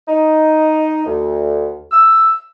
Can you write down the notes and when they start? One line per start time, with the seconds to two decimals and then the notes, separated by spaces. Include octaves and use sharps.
0.08 D#4
1.05 D2
1.91 E6